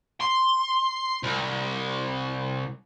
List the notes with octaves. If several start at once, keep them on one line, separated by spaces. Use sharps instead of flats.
C6
C2